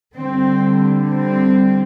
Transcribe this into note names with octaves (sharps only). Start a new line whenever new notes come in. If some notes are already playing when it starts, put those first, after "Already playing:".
D3 G3 C4
C4